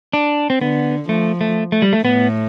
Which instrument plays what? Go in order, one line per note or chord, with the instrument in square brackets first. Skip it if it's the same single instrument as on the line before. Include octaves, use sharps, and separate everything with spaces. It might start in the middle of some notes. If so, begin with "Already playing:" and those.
[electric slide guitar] D4
C4
[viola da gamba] D3 [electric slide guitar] B3
[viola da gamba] F3 [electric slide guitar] A3
[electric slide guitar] A3
A3
G3
A3
[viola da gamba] A2 [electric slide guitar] B3